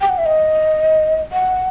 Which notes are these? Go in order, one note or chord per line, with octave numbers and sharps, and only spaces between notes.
G5
F#5
E5
D#5
F#5